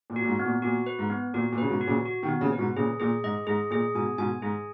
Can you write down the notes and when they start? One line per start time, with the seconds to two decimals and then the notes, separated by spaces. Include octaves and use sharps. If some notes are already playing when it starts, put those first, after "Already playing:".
0.10 A#2
0.16 F#4
0.21 A#2
0.28 G#2
0.39 B3
0.45 A#2
0.62 A#2 F#4
0.86 B4
0.99 G#2
1.10 B3
1.34 A#2 F#4
1.52 A#2
1.58 C#3 B4
1.69 G#2 B2
1.81 F#4
1.87 A#2 C#3
2.05 F#4
2.23 B2 D#3
2.28 B3
2.41 A#2 C#3
2.53 B4
2.58 G#2 B2
2.76 A#2 C#3 G#4
3.00 A#2 G#4
3.24 G#2 D#5
3.47 G#2 G#4
3.71 A#2 G#4
3.95 G#2 B2 G#5
4.18 G#2 B2 G#5
4.42 G#2 G#4